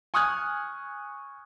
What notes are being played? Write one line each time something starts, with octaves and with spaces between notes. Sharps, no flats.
G#5 C#6 D#6 F6 F#6 G#6